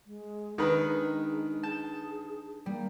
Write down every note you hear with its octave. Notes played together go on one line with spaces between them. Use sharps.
G#3
D#3 G#3 D4 D#4 G#4 B4
G#4 A5 G6
G3 A#3